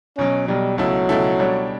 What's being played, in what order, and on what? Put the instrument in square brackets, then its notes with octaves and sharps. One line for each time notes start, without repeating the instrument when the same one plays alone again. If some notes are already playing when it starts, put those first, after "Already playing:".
[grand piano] B1 B2 F#3 [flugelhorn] C#4
[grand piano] B1 B2 F#3 [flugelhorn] G3
[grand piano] C#2 B2 A3 E4 A4 [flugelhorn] F#3
[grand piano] C#2 B2 A3 E4 A4
B2 G3 D4 A4 C#5